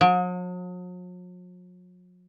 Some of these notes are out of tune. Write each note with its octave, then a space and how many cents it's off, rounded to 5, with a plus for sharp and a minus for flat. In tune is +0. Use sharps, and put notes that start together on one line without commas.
F#3 -45